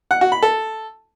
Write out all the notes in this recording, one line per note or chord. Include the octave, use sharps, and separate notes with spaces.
F#5
F#4
B5
A4